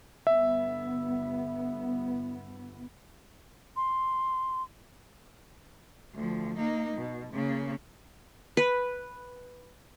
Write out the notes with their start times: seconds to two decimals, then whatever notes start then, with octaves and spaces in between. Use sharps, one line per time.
0.27 G1 B3 E5
3.76 C6
6.14 D2 F3
6.57 A#3 D#4
6.97 B2
7.33 C#3 A#3
8.57 B4